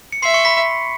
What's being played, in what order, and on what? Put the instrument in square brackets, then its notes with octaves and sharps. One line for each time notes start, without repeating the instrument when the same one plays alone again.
[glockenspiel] C#7
[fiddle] E5 [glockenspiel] C6 C7
[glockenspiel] C#6 C#7
B5 B6